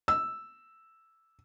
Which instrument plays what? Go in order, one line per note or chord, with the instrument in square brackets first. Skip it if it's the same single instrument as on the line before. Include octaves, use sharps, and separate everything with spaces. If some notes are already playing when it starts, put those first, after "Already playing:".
[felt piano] E6